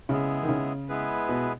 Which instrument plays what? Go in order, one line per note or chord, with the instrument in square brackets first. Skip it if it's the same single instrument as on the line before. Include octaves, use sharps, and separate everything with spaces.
[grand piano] C#3 [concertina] G#3 B3 E4 G#4
[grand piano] D#3
C#3
[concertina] G#3 B3 E4 G#4 B4
[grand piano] B2